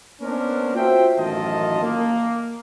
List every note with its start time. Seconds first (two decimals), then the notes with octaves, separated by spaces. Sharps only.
0.20 A#3 B3 C#4 D4 A#4 C5
0.75 F4 F#4 C5 E5 G5
1.18 A1 F#2 D#3 F4 D#5 A5
1.82 A#3